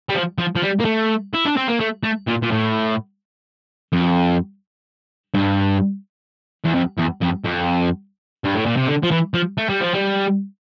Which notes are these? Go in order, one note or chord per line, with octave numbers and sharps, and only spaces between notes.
G3
F3
F3
F3
G3
A#3
A3
E4
D4
C4
A#3
A3
A3
A#2
A#2
A2
F2
G2
E2
F2
E2
F2
F2
G2
A2
A#2
C3
D3
F3
E3
F3
A3
G3
F3
G3